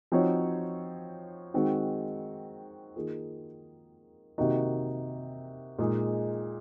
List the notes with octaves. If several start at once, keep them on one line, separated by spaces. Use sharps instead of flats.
F3 C4 D#4 F#4 C#5
D#3 G#3 C4 F#4
D#3 A#3 F4 G#4
C3 D#3 A#3 D#4 F#4
A#2 G#3 D#4 G#4